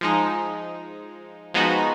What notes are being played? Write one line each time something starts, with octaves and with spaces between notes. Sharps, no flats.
F3 G#3 D#4
F3 G#3 B3 D#4 F#4